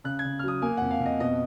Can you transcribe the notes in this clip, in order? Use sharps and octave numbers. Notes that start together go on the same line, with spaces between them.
C#3 F#6
G#6
C#3
F6
F#3 D#6
A#3 G#5
F2 F#5
F5
F2
D#5
B2 D#5